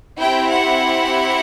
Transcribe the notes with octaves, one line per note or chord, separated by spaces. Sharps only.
C4 E4 G4 G5
F#5